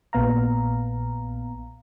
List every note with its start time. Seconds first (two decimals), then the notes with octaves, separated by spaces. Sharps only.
0.13 A#1 A#2 B3 F5 A#5